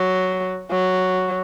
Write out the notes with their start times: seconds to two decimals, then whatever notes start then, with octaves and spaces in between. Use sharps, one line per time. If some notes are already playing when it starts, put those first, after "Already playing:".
Already playing: F#3
0.71 F#3